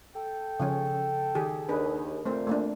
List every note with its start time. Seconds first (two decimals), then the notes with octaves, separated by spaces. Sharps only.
0.14 A4 G5
0.60 C#3 F3 C#4
1.35 D#3 G4 G#4
1.69 D#2 D4 G#4 B4
2.26 A#2 A3 C4 C5
2.47 A3 A#3 D4